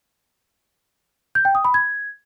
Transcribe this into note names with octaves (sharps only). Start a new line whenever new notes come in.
G6
G5
D#6
B5
G#6